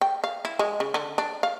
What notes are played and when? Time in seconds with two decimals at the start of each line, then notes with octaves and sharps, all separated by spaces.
0.01 G5
0.24 F5
0.45 E4
0.59 G#3
0.80 C#3
0.94 D3
1.18 D4
1.43 F5